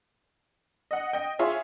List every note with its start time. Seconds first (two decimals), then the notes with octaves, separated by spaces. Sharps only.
0.91 D#5 F#5
1.13 D#5 G5
1.39 F4 G#4 C#5 E5